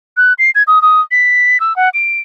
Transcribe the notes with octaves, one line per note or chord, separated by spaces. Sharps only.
F#6
C7
G#6
D#6
D#6
B6
E6
F#5
D7